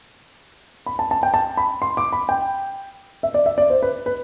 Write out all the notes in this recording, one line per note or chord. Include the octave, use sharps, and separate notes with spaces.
B5
A5
A5
G5
A5
B5
C6
D6
B5
G5
E5
D5
E5
D5
C5
B4
B4